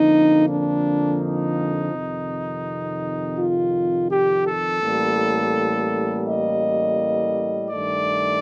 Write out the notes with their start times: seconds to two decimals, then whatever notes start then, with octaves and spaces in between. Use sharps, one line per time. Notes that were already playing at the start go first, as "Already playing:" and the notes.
Already playing: F2 D3 F3 A#3 D#4
0.48 D4
1.19 D#4
1.92 F2 C3 D#3
3.37 F4
4.09 G4
4.45 A4
4.81 A1 A2 G3 A#3
6.26 D#5
7.71 G2 D#3 A3 D5